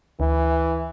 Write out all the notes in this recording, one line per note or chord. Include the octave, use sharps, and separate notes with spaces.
D2 E3